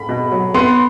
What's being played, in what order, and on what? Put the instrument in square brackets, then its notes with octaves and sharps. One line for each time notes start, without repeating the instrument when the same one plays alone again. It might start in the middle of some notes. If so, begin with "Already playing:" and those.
Already playing: [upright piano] B5
[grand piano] B2
F#3
[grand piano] B3 [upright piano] C6